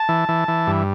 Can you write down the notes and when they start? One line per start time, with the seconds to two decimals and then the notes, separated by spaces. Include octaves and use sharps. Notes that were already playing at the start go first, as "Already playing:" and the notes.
Already playing: A5
0.09 E3
0.29 E3
0.48 E3
0.67 G2